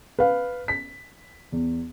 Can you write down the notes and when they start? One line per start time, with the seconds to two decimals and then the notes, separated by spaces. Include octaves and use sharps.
0.19 B4 F5
0.68 B6
1.52 E2